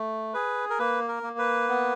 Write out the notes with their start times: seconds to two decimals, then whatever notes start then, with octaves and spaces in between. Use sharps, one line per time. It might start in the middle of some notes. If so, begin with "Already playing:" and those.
Already playing: A3
0.34 G#4 B4
0.70 A#4
0.79 A#3 B4
1.08 A#4
1.23 A#3
1.38 B4
1.69 B3